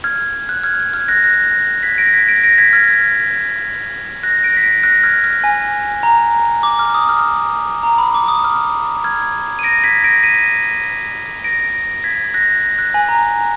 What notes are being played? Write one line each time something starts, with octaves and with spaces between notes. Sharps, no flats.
F6 G#6
F#6
F6 G#6
F6 G#6
F#6 A#6
F#6 A#6
G#6 B6
A#6 D7
G#6 B6
A#6 D7
A#6 D7
G#6 B6
F6 G#6
F6 G#6
F#6 A#6
A#6 D7
B6
A#6 D7
F#6 A#6
F6 G#6
F6
G#5
A#5
D6
F6
D#6
F6
A#5
B5
D6
D#6
F6
F6 G#6
D#7
A#6 D7
G#6 B6
A#6 D7
B6 D#7
A#6 D7
G#6 B6
F#6 A#6
F#6
G#5
A#5